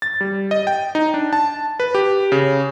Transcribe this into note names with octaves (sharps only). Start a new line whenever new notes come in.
A6
G3
D#5
G5
D#4
D4
A5
B4
G4
C#3